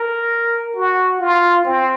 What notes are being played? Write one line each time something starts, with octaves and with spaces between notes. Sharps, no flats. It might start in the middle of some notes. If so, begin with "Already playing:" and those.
Already playing: A#4
F#4
F4
C4